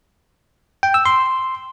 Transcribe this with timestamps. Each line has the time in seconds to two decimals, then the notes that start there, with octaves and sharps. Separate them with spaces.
0.83 G5
0.94 E6
1.06 C6